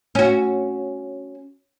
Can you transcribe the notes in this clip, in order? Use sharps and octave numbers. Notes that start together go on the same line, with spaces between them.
C#4 F#4